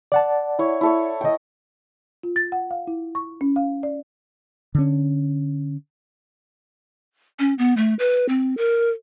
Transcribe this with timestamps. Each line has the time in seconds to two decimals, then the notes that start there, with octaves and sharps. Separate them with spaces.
0.12 D5 F#5 A5
0.59 E4 C#5
0.81 E4 A4 C#5
1.21 D#5 G5
2.23 F4
2.36 A6
2.52 F#5
2.71 F5
2.87 E4
3.15 C#6
3.41 C#4
3.56 F5
3.83 D5
4.75 D3 C#4
7.39 C#4
7.58 B3
7.77 A3
7.99 B4
8.29 C4
8.57 A#4